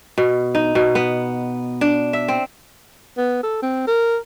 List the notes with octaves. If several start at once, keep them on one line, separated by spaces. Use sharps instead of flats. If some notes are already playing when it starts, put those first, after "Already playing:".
B2
D#4
B2
B3
D4
E5
C4
B3
A4
C4
A#4